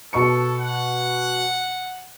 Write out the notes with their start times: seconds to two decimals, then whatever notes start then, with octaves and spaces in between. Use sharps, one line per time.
0.13 B2 A4 C#6 C#7
0.59 F#5